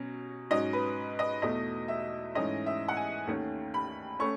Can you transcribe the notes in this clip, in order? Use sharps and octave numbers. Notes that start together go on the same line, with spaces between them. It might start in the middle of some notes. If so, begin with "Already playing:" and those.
Already playing: B2 F#3 C#4
G#2 F#3 C#4 D#5
B4
D#5
E2 B2 A3 D#5
E5
G#2 E3 A3 C#4 D#5
E5
F#5
G#5
D#2 D#3 A3 C#4
B5
A3 C#4 C#6